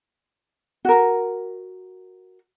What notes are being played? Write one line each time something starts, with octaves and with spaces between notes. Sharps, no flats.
F#4 A#4